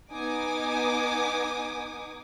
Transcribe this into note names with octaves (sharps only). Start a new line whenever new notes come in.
B3 D#4 G#5 D6 D#6